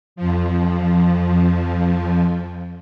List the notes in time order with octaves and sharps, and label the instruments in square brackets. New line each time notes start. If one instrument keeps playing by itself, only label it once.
[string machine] F2 F3